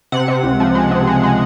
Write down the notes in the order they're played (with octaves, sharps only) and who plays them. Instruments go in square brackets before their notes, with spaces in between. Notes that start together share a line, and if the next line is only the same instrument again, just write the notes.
[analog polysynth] C3 F#5
C3
C#2
F3
G#3
C3
G#3
G#3